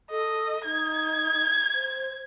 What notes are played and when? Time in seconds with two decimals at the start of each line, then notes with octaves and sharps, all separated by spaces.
0.10 A4 D#5
0.65 D#4 G#6
1.75 C5